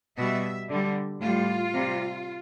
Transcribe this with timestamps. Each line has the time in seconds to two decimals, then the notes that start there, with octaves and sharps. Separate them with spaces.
0.17 B2 G3 E5
0.69 D3 G3
1.21 A2 G3 F4
1.73 C3 G3